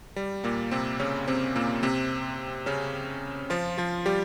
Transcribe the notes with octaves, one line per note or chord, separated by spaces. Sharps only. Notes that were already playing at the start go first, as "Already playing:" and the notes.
G3
A#2 A#3
C3 C4
C#3 C#4
C3 C4
A#2 A#3
C3 C4
C#3 C#4
F3 F4
F3 F4
G3 G4